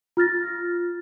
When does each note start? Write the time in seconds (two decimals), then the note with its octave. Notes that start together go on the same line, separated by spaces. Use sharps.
0.17 F4 F6 A6 A#6